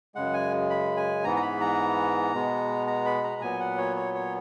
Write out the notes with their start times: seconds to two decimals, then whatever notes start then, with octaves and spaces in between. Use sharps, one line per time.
0.15 F#2 C#3 G#3 F#5
0.33 G#5
0.70 B5
0.97 G#5
1.24 G#2 E3 B3 A#5
1.36 A#5
1.42 B5
1.61 A#5
2.33 B2 G#3 B3
2.87 A#5
3.06 B5
3.24 A#5
3.41 A#2 F#3 B3 G#5
3.60 F#5
3.78 C#5
3.96 C#5
4.14 C#5